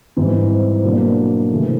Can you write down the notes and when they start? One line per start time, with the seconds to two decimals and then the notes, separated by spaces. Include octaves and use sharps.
0.16 G#2 E3 G3 C4
0.84 B2 F#3 A#3 D4
1.50 C3 E3 A3